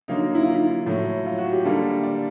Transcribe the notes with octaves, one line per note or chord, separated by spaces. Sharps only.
D3 F#3 A#3 D#4
D#4
E4
F4
E4
A2 F#3 A3
F4
F#4
G4
D3 G3 A#3 A4
D5